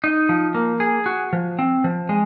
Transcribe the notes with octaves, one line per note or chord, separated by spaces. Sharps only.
D#4
F3
A#3
G#4
F#4
F3
C4
F3
G#3